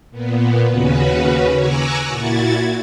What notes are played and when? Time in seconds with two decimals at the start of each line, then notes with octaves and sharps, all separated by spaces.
0.11 A#2 B3
0.69 D#2 C#3 C#4 F#4 B4
1.56 G#5 A#5 C#6 D6 E6 F#6
2.08 A#2 E4 F#4 G#6 A6